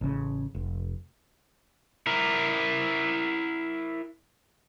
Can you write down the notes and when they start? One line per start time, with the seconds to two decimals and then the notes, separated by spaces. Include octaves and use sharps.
0.01 A1 C#3
0.55 F1
2.07 E4 A#4